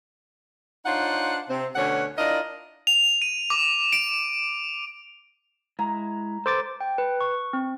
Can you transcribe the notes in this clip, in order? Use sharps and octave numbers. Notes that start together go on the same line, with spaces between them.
D4 D#4 F4 C5 C#5 F#5
C3 C4
D2 B2 D3 C#4 C#5 F#5
D4 E4 F4 A#4 D5 D#5
F7
D#7
D6
D7
G#3 E4 A#5
A4 B4 C5 D6 A6
G5
B4
C#6
C4